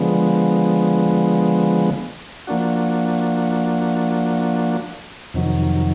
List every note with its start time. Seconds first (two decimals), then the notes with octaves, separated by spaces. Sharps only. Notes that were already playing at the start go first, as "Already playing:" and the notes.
Already playing: D3 F3 G#3 B3
2.47 F3 A#3 D4 F#4
5.34 F2 C3 D#3 F#3